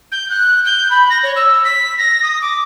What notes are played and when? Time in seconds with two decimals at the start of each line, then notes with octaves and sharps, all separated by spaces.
0.11 G6
0.29 F#6
0.65 G6
0.90 B5
1.10 A#6
1.23 C#5
1.36 E6
1.64 B6
1.98 A#6
2.22 D#6
2.41 D6